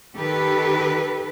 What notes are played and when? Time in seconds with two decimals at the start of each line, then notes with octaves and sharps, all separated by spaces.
0.16 D#3 G4 A4 B4